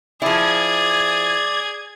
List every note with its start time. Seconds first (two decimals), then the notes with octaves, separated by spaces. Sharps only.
0.22 F3 E4 G#4 D5 G#6